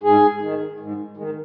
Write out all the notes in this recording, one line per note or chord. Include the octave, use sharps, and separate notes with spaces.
G#2 G#4
D#3
G#2
D#3 G#3